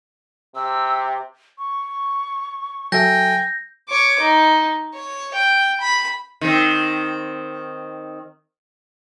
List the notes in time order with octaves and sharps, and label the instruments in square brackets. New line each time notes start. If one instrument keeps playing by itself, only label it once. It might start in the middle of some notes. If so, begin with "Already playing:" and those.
[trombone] C3 [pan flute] E6
[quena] C#6
[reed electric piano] F#3 A4 E5 [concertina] G5 G#5 [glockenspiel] G6 A#6
[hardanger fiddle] C#5 D6
D#4
C#5
G5
B5
[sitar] D#3 C4